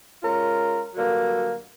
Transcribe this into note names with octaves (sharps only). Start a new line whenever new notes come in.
G#3 C#4 F4 A#4
G2 D3 F#3 A#3